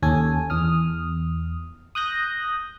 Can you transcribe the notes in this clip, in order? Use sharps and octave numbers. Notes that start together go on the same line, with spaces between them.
D#2 C#4 A4 G#5
E2 D#6 F6
D#6 F#6 G6 A#6